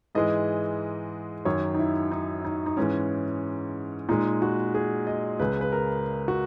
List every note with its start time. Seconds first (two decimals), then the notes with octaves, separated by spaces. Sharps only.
0.15 G#2 E3 G#3 D#5
1.45 F#2 D#3 F#3 C#5
1.74 D#4
1.79 E4
2.12 D#4
2.45 D#4
2.66 D#4
2.77 G#2 E3 G#3 C#4
4.09 A#2 G#3 D#4
4.42 F#4
4.74 G#4
5.07 D#5
5.39 C#2 C#3 G#3 B4
5.61 B4
5.72 A#4
6.28 F#4